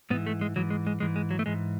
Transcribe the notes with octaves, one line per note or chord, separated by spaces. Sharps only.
G#2 E3 B3
A3
G#3
G#2 E3 F#3
G#3
G#3
G#2 E3 G#3
G#3
F#3
A3
G#2 E3 G#3